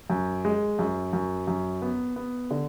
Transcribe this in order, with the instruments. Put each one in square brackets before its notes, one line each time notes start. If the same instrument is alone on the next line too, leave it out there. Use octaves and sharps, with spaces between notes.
[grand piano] F#2
G#3
F#2
F#2
F#2
B3
B3
D3